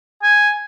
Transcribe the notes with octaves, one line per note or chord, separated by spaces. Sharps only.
G#5